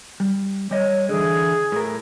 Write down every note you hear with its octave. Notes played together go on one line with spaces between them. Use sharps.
G3
G3 C#5 D#5
D3 E3 G#4
A2 A#4